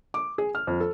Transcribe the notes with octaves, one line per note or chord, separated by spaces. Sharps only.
D6
G#4
F6
F2
A4